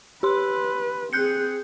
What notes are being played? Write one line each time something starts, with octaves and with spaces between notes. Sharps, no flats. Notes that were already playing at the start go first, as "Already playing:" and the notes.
G4 B4 C6
C4 G#4 F#6 G6 C#7